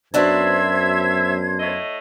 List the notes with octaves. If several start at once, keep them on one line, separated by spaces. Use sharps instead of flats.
F#2 F#3 B3 D4 C5 E5 G#6
A2 A3 D#5